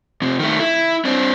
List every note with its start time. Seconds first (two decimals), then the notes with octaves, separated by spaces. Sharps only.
0.22 F2 C3
0.39 D#3 A3
0.60 E4
1.05 C4 D4